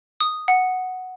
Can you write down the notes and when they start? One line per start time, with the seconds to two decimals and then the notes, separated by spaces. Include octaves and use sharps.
0.20 D#6
0.48 F#5